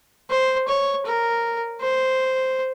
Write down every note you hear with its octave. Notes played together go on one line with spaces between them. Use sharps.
C5
C#5
A#4
C5